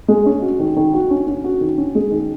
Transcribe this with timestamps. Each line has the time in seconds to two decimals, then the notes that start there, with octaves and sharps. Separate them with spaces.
0.08 G#3
0.26 C#4
0.42 F#4
0.59 D#3
0.76 D#3
0.94 F#4
1.10 C#4
1.27 C#4
1.44 F#4
1.61 D#3
1.77 C#4
1.95 G#3
2.11 D#3